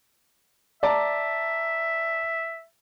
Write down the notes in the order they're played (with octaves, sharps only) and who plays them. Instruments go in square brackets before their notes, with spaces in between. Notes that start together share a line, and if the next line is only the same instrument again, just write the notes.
[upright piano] D5 A5 A#5 [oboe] E5